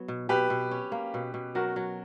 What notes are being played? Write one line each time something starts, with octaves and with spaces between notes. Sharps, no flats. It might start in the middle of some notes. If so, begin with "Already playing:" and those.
Already playing: F#3 B3
B2
B2 G4 B4
B2
C#4
A#3
B2
B2
F#3 F#4 A#4
F#3